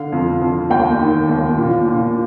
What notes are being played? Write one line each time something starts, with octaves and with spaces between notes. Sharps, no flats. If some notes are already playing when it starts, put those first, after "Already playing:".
Already playing: D3 F5
F2
F2
D#2 G5
D#3
D#2
A#2
A#2